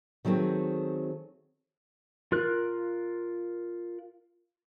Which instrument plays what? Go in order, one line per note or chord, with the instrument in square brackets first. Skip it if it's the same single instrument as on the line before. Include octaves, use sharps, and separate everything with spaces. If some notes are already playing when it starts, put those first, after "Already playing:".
[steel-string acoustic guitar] D#3 F#3 A3 C4 G#4
[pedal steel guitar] F4 A#4 F#6